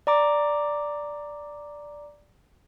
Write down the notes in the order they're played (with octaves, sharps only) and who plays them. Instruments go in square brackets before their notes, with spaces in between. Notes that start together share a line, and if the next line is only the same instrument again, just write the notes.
[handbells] D5 A#5 D6